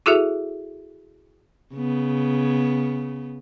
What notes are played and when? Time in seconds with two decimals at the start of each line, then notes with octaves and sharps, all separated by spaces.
0.06 E4 F#4 G#4 A4 E5
1.74 C#3 B3